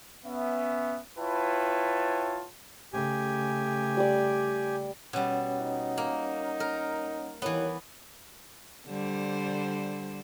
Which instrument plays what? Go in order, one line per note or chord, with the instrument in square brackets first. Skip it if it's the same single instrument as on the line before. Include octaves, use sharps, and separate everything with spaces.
[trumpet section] B3 C#4 E5
E4 F4 B4 C#5 G5 A5
[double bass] C#3 A3 [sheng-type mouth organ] G4 G#5
[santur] G3 D5
[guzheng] B2 G3 [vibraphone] C#4 C#5 F#5
[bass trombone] D#4
[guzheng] A#3
A#4
[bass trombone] D#2 [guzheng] E3 B3 [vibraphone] E4 A#4 C#5
[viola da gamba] D3 G3 C5